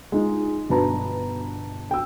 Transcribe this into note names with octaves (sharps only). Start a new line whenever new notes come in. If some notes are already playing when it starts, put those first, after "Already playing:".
G#3 D#4 F4
G1 B2 B4 A5 A#5
G5 E6